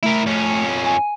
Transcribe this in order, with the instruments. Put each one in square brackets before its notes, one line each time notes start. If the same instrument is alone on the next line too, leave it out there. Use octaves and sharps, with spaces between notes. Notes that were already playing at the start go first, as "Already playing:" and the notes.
[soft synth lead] A3 [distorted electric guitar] E4 A#4
[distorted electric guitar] F2 C#4
[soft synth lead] G#5